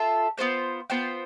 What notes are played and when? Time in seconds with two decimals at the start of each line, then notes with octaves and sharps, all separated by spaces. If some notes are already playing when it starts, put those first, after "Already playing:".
Already playing: F4 A4 E5
0.38 B3 F4 C5 G5
0.90 B3 F4 C5 G5